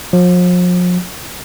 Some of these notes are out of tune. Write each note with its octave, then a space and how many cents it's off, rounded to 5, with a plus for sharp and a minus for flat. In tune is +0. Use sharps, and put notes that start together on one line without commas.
F3 +40